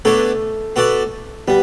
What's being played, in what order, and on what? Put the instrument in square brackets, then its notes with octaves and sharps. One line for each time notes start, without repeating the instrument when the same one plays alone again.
[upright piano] A3 [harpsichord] B3 D4 A4 C#5
[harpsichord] B3 F#4 A4 D5
[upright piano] G3 [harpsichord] B3